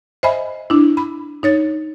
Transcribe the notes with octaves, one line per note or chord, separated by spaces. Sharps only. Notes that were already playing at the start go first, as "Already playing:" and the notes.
C5 D#5 E5 G#5 B5
D4 E4
B5
D#4 C#5 A6